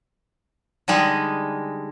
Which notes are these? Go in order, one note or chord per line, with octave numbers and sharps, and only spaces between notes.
D3 G3 G#3 D#4